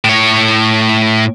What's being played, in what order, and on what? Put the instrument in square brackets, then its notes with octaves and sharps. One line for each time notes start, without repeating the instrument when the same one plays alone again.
[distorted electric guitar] A2 C#5